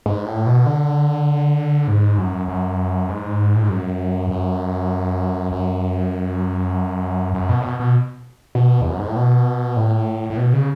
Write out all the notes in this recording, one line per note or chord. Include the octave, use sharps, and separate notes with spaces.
G#2
A2
B2
D3
G#2
F#2
F#2
G#2
A2
G#2
F#2
F#2
F#2
F#2
B2
A2
B2
B2
B2
E2
F#2
G#2
A2
B2
A2
A2
B2
C#3